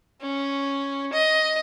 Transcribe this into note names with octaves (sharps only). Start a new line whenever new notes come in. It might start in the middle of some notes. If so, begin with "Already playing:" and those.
C#4
D#5